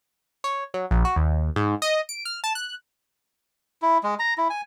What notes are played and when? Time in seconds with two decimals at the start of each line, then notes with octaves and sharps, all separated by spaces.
0.44 C#5
0.74 F#3
0.91 A#1
1.05 F#4
1.16 D#2
1.56 G#2
1.82 D#5
2.09 D7
2.25 F6
2.44 A5
2.55 F#6
3.82 E4
4.03 G#3
4.19 A#5
4.38 E4
4.50 G#5